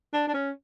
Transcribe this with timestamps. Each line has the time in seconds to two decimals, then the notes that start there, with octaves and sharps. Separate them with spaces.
0.13 D4
0.28 D4
0.34 C#4